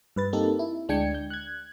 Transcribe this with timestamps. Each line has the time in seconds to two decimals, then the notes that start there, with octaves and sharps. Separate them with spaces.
0.16 G2 B4 A6
0.33 A#3 C4 D#4 G4 A4
0.59 E4
0.88 D2 G#3 D4 G5 G#6 C#7
1.14 G6
1.30 F#6 G#6